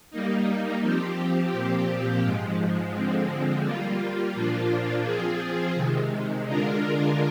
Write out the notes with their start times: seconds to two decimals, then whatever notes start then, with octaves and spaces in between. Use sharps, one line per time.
0.11 G3 A#3 D#4
0.81 F3 C4 G4
1.52 A#2 F3 C4 G4
2.23 G#2 F3 G#3
2.94 D3 F3 G#3 C4
3.64 G3 A#3 F4
4.34 A#2 F3 A#3 D4 F4
5.04 F3 C4 F4 G#4
5.74 C3 D#3 G#3
6.45 D3 G#3 D4 F4 A#4